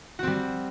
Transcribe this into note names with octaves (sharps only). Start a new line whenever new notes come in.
G3 C4 F#4